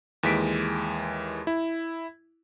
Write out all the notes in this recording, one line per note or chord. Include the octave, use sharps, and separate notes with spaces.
D#2 E3 G#3 B6 D7
E4